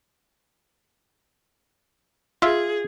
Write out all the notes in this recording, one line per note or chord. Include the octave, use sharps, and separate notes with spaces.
F4 G#4 E5